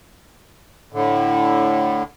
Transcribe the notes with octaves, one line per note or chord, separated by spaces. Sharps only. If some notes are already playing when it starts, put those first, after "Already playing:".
A2 D3